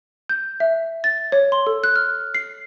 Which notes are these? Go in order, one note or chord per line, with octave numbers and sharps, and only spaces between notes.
G6
E5
A6
C#5
C6
A4
F#6
F6
C7